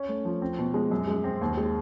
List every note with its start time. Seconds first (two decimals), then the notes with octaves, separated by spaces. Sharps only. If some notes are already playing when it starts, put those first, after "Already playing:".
Already playing: C#4
0.09 A3
0.25 F3
0.42 C4
0.59 B2
0.74 G#3
0.91 F#2
1.08 G#3
1.24 C4
1.41 D#2
1.57 G#3